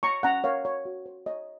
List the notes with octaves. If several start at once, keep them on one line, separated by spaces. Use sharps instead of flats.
C#5 A#5 C#6
C#4 F#5 A#5
A#4 C#5 F5
C#5
F#4
C5
C#5 D#5